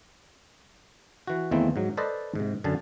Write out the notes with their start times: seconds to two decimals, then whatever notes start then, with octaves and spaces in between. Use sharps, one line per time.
1.27 E3 F#4
1.51 E2 D#3 E3 A3 A#3 C4
1.76 G#2 F#3
1.97 A4 B4 C5 D5 D#5 A5
2.35 G#2 C3
2.64 F#2 D3 G#5 A5